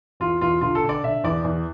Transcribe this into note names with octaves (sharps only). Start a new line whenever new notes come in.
E2 F4
E2 F4
D3 F4
A4
D3
D5
D3 E5
E2 D5
E2